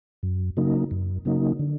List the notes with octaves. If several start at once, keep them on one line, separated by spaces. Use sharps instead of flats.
F#2
C#3 F#3 A#3 D#4
F#2
C#3 F#3 A#3 D#4
D3